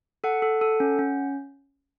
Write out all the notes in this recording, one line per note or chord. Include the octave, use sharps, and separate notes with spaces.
A4 F#5
A4
A4
C#4
C#4